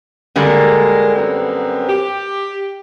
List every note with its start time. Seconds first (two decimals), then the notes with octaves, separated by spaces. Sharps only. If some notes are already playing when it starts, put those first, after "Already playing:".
0.36 D3 G3 G#3 A#3 A#4
1.16 F#2 B3 C4
1.88 G4